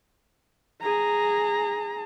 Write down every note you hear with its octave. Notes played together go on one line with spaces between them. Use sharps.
G#4 A#5